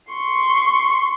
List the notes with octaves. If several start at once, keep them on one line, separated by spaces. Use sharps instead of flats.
C6 C#6